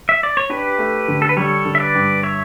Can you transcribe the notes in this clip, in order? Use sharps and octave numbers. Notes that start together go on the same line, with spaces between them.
E5
D5
C#5
D4 G4 B4
A3
D3
A4
B4
G3 A4 C#5
D3
E5
B4 D5
G2
C#5 E5